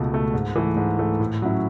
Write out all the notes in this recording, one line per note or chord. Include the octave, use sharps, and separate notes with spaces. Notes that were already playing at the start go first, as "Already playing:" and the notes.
Already playing: C#2 B2 A3
B2 A3
G#2
E3 A3
G#2
E3 A3
A2
F#3 C#4 E4